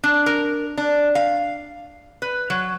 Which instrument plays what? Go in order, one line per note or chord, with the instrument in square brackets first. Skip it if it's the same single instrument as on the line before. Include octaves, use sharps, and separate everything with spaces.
[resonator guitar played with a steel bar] D4
A#4
D4
F5
B4
F#3